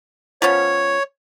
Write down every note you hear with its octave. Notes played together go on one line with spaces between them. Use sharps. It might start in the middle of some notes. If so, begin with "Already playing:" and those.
F3 B3 C#4 C#5